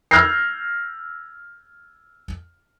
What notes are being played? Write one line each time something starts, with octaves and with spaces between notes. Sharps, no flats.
E6 F6 G6 G#6 A#6 C7